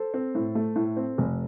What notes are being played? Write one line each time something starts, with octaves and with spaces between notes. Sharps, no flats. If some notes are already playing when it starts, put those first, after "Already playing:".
Already playing: A4 C5
C4
A2
A3
A2
C4
F1